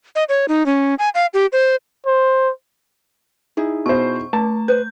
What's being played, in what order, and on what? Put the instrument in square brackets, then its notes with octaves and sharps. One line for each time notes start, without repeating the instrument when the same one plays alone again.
[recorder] D#5
C#5
D#4
C#4
G#5
F5
G4
C5
[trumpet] C5
[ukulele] D#4 E4 G#4
[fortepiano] B2 C5 [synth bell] C#6
[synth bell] A3 [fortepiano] A5
[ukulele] B4 C5 [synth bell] G6